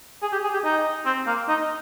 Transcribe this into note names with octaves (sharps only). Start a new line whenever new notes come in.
G#4
G4
G#4
G4
D#4
C4
A#3
D#4